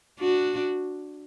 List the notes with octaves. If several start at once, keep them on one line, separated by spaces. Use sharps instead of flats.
D4 F#4